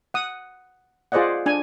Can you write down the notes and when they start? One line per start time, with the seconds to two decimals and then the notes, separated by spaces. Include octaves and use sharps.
0.14 F#5 D#6
1.12 F4 G#4 C5 D5 D#5 F#5
1.46 D4 G#5